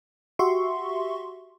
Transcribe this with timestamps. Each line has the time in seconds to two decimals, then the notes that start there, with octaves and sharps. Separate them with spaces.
0.39 F#4 G4 E5 C6 C#6